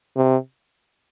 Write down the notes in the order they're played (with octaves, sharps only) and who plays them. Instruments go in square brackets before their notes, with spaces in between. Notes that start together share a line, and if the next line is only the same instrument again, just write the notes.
[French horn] C3